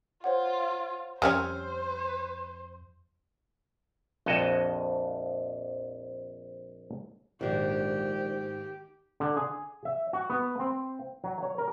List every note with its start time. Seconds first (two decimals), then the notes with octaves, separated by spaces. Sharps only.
0.24 F4 C5 C#5 F#5
1.22 F2 G3 C#4 C5 C#5 E6 F6
4.26 A#1 F2 F#4 D#5 A5
7.41 A#1 G#2 D#3 D4 F#4 G4
9.20 D3
9.37 G#4
9.85 E5
10.13 F#4
10.30 B3
10.59 C4
11.24 F#3
11.43 C#5
11.58 A#4